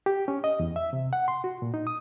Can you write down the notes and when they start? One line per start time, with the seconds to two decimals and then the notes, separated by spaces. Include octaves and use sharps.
0.06 G4
0.28 C#4
0.44 D#5
0.60 E2
0.76 E5
0.93 C3
1.13 F#5
1.28 C6
1.44 F#4
1.62 A#2
1.74 D#4
1.87 D#6